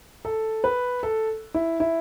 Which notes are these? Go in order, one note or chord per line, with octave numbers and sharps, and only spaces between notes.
A4
B4
A4
E4
E4